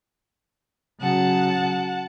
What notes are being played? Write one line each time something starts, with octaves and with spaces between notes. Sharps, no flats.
C#3 F#3 F#5 A5